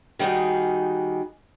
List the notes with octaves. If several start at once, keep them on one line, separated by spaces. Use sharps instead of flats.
D#3 G3 D#4 F#4 G#4